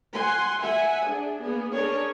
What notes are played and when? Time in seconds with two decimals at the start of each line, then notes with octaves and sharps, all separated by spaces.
0.12 F#5 G#5 C6
0.59 E5 F#5 G#5
1.04 D4 G#4
1.41 A#3 B3 G#4
1.74 C#4 D4 G#4 A#4 C#5